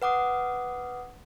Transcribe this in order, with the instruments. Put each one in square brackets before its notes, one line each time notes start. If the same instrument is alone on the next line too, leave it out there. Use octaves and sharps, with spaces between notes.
[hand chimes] B4 F#5 D6 D#6